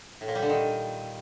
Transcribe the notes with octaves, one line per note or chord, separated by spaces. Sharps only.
A2
A#2
G3
D3
D#3